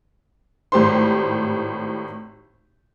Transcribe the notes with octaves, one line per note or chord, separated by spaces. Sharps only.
G#1 A2 G4 C5 C6